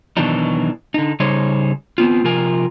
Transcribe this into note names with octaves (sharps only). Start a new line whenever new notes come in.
B2 D#3 E3 F#3 D4 D#4
D3 D#4
C#3 G3 D#4 C5 C#5
B3 C4 F4
C3 F3 F4 A#4 G#5